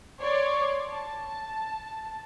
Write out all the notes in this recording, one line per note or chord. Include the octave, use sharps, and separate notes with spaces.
C#5 D5 C6 D6
A5